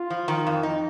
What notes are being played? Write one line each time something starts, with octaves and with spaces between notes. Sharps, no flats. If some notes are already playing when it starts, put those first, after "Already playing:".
Already playing: F4
F3
D#3
F2
D#4